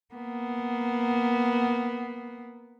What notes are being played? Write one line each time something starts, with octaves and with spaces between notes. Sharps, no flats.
A#3 B3